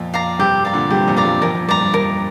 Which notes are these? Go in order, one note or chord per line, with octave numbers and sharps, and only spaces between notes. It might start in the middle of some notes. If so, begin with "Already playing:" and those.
Already playing: F2 A#2
D5 F5 A#5
G2 C3 G4
D5 F5 A#5
A#2 D3
G2 C3 G4
F2 A#2
D5 F5 A#5
G2
F2 A#2 A#4
F2
G2 D5 A#5
G2
F2 A#4